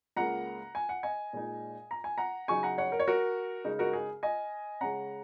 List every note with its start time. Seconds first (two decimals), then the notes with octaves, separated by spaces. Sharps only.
0.16 C#2 C#3 A#3 F#5 A#5
0.75 G#5
0.89 F#5
1.03 D#5 G#5
1.33 A#2 G#3 D#4
1.91 A#5
2.04 G#5
2.18 F#5 A#5
2.48 C#3 F#3 D#4 G#5 C#6
2.63 F#5 A#5
2.78 C#5 F#5
2.92 A#4
2.99 C#5
3.07 F#4 A#4
3.65 C#3 G#3 D#4
3.79 F#4 A#4
3.93 G#4
4.23 D#5 G#5
4.81 C#3 G#3 C#4 F#5 A#5